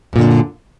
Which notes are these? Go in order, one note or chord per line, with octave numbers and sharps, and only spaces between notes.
F#2 A#2 D3